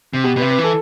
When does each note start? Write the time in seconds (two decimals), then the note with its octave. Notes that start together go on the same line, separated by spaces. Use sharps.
0.13 C3
0.24 B2 G4
0.36 B2 B4
0.42 C3
0.50 B4
0.59 E3 A4